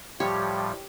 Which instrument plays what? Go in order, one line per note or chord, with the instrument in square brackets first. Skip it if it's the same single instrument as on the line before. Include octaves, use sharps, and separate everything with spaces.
[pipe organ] A2 F3 G3 [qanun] G4 C#5